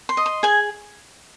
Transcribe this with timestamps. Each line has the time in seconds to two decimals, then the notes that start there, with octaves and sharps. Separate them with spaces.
0.09 C6
0.17 D#5
0.26 C6
0.43 G#4 G#5